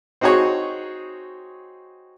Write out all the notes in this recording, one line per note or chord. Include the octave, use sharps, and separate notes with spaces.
C4 D#4 F#4 G#4 C#5